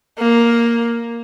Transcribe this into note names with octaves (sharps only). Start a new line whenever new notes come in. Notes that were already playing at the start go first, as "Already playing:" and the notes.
A#3